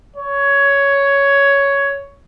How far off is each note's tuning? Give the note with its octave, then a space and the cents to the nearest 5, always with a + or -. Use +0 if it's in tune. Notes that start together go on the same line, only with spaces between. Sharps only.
C#5 +10